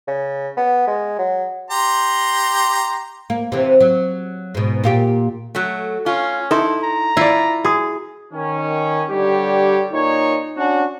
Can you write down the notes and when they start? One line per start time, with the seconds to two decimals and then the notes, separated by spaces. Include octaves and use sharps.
0.08 C#3
0.57 B3
0.87 G#3
1.19 F#3
1.71 G4 A#5 C6
3.30 A#3
3.52 C3 E3
3.81 F#3
4.55 G#2 B2
4.84 A#2 F4 G4
5.55 F#3 A3
6.06 C#4 F4
6.51 D#4 E4 A4 A5 C6
6.83 A#5
7.17 E4 F4 D5
7.65 F#4 G#4 D#6
8.32 D#3 C#4
9.09 D3 G3 G4 C#5
9.92 A#2 D#4 C#5
10.56 C#4 D4 F#4